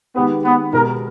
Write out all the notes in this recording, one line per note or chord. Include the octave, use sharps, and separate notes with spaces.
D#3 G#3 B3 D#4 G4 B4
B3
B2 G#3 B3 G4 A#4